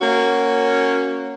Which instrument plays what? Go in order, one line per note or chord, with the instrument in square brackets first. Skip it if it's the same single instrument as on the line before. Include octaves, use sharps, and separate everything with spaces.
[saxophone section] A#3 C#4 F#4